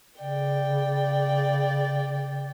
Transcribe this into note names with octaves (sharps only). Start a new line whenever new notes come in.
C#3 D5 G5